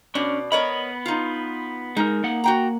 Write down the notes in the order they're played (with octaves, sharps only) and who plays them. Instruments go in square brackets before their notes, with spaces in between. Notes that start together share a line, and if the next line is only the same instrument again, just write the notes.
[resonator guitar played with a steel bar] B2 D5 [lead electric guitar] C#4 D4
[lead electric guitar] B3 B5 [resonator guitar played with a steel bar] A#4 C#5 D#5
[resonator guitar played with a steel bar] D#4 F4
[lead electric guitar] G#3 A#4 [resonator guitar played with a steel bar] D#4
[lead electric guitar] A#3 F#5
[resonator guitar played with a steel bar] F#4 G5 A#5